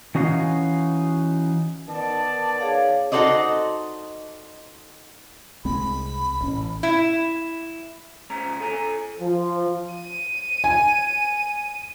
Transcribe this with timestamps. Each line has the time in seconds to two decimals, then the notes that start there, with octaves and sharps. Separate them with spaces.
0.15 E3 C#4 D#4 F#4 F5
1.88 D#3 B3 D5 A5
2.61 G#4 C#5 F5
3.12 D#4 F#4 A4 C5 D5 D#5
5.65 C2 G#3 C4 B5
6.41 A1 C#4
6.83 E4
8.30 C#2 C#3 C#4 A#5
8.61 A4 G#5 A#5
9.20 F3
9.94 D#7
10.64 G#5